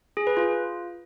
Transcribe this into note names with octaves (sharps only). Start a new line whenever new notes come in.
G#4
B4
F4